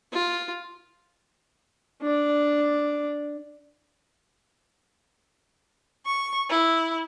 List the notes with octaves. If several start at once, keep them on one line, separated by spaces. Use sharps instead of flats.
F4
D4 D5
C#6
E4